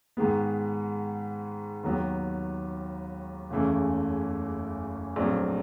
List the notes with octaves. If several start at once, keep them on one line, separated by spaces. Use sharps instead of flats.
G#2 D#3 G#3 B3
D#2 D#3 F#3 B3
F#1 E2 C#3 E3 A3
A#1 A#2 F#3 A3 C4